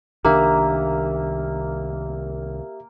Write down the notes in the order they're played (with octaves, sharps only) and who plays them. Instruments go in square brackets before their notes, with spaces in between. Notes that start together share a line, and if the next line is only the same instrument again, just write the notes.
[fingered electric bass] C2 D#3 D4 [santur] A#3 [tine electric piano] G4 E5